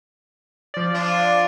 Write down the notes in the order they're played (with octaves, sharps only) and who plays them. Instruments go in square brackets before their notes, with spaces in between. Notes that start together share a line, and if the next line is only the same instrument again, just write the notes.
[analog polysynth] F3 D5
[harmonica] D4 F4